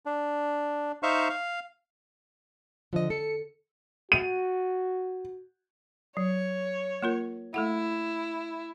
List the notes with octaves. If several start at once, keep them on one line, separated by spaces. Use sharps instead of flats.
D4
D#4 C5 E5 F5 C#6
F5
D3 F3 D#5
A4 C#7
F#4 D#7
F#3 C#5
A#3 F4 A#4
A3 E4 A4 F#5